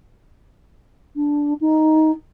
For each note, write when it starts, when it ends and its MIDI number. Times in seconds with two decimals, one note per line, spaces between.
1.16 1.54 62
1.61 2.11 63